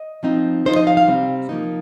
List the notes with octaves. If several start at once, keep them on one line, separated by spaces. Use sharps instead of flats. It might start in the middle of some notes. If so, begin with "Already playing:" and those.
Already playing: D#5
F3 C4 D#4
F3 D#4 C5
D#5
F5
F5
C3 G3 C4
F3 A#3 D#4